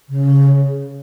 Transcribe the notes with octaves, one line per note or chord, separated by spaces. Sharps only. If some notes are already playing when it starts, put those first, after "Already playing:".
C#3